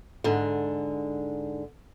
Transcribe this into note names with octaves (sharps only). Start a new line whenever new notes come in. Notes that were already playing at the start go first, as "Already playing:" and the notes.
G#2 D3